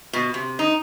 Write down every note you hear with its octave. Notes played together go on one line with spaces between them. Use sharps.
B2
C3
D#4